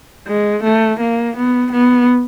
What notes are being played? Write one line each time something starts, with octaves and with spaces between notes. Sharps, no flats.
G#3
A3
A#3
B3
B3